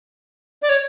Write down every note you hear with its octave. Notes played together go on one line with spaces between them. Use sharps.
D5
C#5